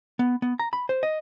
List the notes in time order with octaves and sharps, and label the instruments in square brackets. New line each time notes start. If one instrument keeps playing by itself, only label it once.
[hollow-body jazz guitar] B3
B3
A#5
B5
C5
D#5